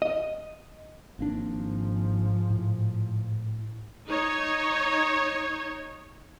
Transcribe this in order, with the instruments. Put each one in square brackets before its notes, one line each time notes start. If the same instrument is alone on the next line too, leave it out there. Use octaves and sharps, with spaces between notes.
[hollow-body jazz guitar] D#5
[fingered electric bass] G#1 A#3 D4 [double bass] G#2 F3
[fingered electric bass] A2
[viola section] D#4 C#5